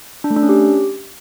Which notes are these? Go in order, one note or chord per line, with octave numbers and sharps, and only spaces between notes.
D4
A3
D4
C#4
G4